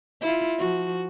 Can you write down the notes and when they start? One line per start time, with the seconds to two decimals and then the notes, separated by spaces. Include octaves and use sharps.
0.21 E4 F4
0.58 F3 F#4